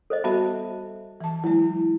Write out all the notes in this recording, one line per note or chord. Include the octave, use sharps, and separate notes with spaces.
A4 C5 D#5
G3 B3 F#4 E5 A5 B5
E3 A5
F#3 G#3 E4